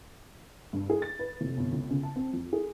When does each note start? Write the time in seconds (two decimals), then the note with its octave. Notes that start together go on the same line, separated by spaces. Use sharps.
0.73 G2
0.90 G#4
1.02 A6
1.19 B4
1.41 F1
1.57 G1
1.72 C#2
1.91 C#3
2.03 A5
2.16 C4
2.33 F2
2.53 G#4